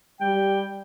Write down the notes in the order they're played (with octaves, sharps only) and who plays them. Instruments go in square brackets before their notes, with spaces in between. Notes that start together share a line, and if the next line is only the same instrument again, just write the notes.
[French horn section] G3 [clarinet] G5